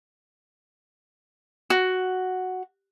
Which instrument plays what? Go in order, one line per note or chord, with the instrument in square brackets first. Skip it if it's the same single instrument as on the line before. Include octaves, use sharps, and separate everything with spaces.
[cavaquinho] F#4